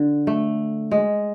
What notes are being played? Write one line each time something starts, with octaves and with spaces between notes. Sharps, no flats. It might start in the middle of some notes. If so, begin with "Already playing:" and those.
Already playing: D3
A3
G#3